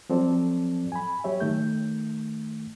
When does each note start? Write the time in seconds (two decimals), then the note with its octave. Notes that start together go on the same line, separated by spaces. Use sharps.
0.10 F3 F#3 C4 A4 D5
0.92 G#5 B5
1.24 F#3 G4 C#5 E5
1.40 D#3 A3 G6